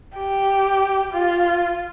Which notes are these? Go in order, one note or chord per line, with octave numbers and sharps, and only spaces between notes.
G4
F4